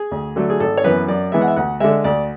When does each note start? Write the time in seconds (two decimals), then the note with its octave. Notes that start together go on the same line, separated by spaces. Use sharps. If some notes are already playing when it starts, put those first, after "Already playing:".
Already playing: G#4
0.11 D2
0.36 D3 F#3 A3
0.50 G#4
0.60 G#1 A4
0.77 C#5
0.84 F#2 E3 B3 B4
1.08 F#2 D5
1.32 E3 G#3 B3 E5
1.41 F#5
1.48 E5
1.56 D2 F#5
1.80 D3 G#3 E5
2.04 D2 D5